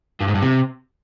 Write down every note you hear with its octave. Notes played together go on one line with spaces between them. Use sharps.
G2
G#2
G2
C3